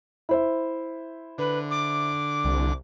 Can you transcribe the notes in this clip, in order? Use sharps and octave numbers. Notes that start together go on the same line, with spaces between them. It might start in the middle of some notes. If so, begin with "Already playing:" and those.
E4 C5 E5
D3 B4
D6
C2